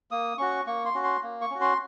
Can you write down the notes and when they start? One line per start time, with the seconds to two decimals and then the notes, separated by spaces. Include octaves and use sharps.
0.11 A#3 D#6
0.38 C#4 F#4 C#6
0.67 A#3 C#6
0.85 C6
0.94 C#4 F#4
1.04 C6
1.23 A#3
1.41 C#6
1.50 C#4 F#4
1.61 C6